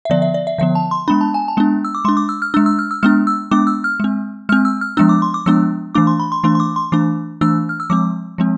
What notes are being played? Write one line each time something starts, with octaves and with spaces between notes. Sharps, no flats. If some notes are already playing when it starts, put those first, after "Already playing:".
E5
D3 F3 B3 D5
E5
D5
E5
D3 F3 B3 E5
A5
C6
G#3 B3 D4 B5
A5
G#5
A5
G#3 B3 D4
E6
D6
G#3 D4 C6
D6
E6
F6
G#3 D4 E6
E6
F6
E6
G#3 B3 D4 F6
E6
G#3 B3 D4 D6
E6
F6
G#3 C4
G#3 C4 F6
E6
F6
F3 G#3 B3 D4 E6
D6
C6
D6
F3 G#3 B3 D4 E6
E3 A3 D4 D6
C6
B5
C6
E3 A3 D4 C6
C6
D6
C6
E3 A3 D4 D6
E3 A3 D4 E6
F6
E6
F3 G#3 C4 D6
F3 G#3 C4